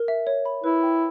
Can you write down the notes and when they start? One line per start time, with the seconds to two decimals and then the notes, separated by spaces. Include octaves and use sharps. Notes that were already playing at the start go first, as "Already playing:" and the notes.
Already playing: A#4
0.08 E5
0.27 C#5
0.45 B5
0.64 E4 B4
0.83 G5